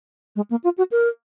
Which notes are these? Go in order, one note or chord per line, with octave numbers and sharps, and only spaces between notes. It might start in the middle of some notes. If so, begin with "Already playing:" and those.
G#3
A#3
F4
F#4
A#4